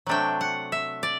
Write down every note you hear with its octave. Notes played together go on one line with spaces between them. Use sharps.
C3 F#3 A3 D4 G5
F#5
E5
D5